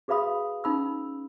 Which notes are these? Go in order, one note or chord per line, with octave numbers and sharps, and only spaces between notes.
F#4 G#4 B4 F5 B5 D#6
C#4 D#4 B5 E6